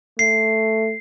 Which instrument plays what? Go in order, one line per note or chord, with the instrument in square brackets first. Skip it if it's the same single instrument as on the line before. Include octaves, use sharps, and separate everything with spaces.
[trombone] A3 [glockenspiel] C7